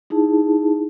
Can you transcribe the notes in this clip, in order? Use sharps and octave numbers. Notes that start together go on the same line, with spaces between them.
D#4 E4 G#4 A5